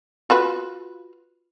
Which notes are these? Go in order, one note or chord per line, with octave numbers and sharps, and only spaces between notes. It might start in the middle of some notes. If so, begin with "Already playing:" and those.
F4 F#4 B4